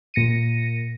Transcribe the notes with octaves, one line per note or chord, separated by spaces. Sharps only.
A#2 A#6 C#7 D#7